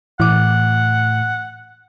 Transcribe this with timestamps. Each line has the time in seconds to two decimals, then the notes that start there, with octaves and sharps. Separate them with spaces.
0.20 A2 E3 F#5 D6